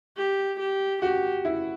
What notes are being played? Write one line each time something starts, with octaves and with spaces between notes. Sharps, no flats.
G4
G4
F#4 G4
E4